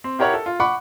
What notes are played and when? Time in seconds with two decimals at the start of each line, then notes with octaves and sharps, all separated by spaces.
0.04 C4
0.19 E4 G4 A#4 C#5 F#5 C#6
0.34 A4
0.46 F4
0.60 F#5 B5 C#6 D6